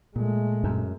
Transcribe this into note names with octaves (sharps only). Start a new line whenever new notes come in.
A#2 G#3 A3
F#2